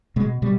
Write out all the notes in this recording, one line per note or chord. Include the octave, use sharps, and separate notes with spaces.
B2 G#3
B2 G3